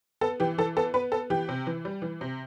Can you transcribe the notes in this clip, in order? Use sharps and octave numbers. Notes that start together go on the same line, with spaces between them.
B3 A4
E3 G4
E3 A4
B3 A4
B3 B4
B3 A4
E3 G4
C3
E3
G3
E3
C3